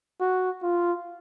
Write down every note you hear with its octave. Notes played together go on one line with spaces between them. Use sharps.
F#4
F4